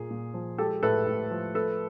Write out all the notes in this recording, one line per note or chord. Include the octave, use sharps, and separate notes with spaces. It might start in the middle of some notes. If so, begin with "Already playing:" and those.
Already playing: A#2 A#3 G#4
A#2
F3
G#3 G4 A4
A2 A4 B4
A2
F3
A3 A4 B4